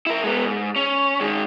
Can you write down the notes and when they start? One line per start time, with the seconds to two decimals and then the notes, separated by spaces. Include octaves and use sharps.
0.07 E4 A#4
0.24 G#3 B3
0.45 G#2
0.76 C#4
1.21 D#3 G#3